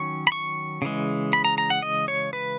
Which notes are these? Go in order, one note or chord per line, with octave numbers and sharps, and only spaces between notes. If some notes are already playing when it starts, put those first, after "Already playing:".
Already playing: D#3 F#3 C#4 C#6
B5
C#6
C#3 E3 G#3
B5
A#5
A#5
F#5
D#5
C#5
B4